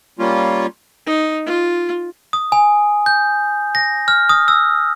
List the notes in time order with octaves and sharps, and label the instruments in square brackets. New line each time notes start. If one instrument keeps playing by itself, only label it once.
[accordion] G3 A#3 C#4 F4
[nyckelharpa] D#4
F4
[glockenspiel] D#6
G#5
G6
A#6
F6
D#6
E6